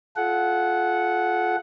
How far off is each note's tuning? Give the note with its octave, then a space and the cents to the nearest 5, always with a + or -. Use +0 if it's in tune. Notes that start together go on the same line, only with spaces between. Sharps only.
F4 +0 A4 -40 F#5 +0